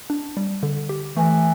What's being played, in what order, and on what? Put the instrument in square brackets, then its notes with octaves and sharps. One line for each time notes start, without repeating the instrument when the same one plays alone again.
[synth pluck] D4
G3
D3
G4
[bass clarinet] E3 [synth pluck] A3